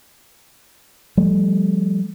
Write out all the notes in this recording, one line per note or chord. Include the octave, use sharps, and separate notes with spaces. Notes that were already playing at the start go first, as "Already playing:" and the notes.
F3 G3 A3